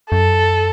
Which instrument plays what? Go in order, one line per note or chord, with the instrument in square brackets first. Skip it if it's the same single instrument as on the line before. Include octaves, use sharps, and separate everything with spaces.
[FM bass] F#2 [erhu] A4